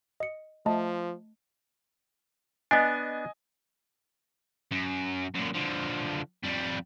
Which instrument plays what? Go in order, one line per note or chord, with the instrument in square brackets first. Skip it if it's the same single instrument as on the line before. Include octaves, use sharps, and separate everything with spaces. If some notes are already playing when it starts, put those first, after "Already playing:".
[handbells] D#5 C#7
[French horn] F3 [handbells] A3 D#5 A5
[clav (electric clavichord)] B3 D4 [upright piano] D#5 G#5
[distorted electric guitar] F#2
F#2 A#2
D3 F3
F2 G3